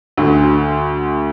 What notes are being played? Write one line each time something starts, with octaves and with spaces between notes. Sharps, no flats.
D2 D3